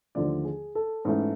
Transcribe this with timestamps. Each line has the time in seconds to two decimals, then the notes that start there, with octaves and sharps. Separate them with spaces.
0.15 D#2 D3 F3 A3 D5
0.45 G#4
0.75 A4
1.05 G#2 E3 A3 C#4